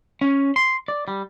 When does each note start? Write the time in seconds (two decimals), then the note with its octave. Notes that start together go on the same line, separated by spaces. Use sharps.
0.21 C#4
0.56 C6
0.88 D5
1.08 G3